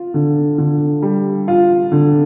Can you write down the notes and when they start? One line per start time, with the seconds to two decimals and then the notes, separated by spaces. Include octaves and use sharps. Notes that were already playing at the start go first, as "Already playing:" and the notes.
Already playing: F4
0.14 D3
0.58 D3
1.02 G3
1.48 F4
1.92 D3